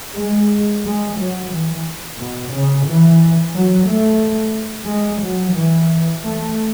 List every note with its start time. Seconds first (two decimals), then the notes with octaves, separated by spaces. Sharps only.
0.17 G#3
0.84 G#3
1.18 F#3
1.52 E3
2.19 B2
2.53 C#3
2.85 E3
3.53 F#3
3.86 A3
4.87 G#3
5.22 F#3
5.54 E3
6.22 A3